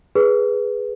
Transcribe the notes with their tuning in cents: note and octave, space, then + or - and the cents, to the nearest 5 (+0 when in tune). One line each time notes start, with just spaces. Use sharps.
G#4 +0 B4 +0